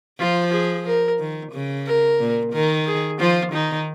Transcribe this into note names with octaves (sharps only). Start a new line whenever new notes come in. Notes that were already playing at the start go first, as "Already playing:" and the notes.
F3 F4
G#4
A#4
D#3
C#3
A#4
A#2
D#3 A#4
G#4
F3 F4
D#3 D#4